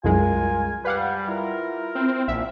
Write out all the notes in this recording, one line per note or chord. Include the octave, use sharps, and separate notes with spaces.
C2 F#2 G#3 F4 A#4 G#5
G3 B4 F5 F#5
E4 F4 A#4
C4
A#1 E5